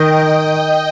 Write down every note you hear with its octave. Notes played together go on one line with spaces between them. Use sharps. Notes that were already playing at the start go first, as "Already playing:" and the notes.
Already playing: D#3 D#5 G5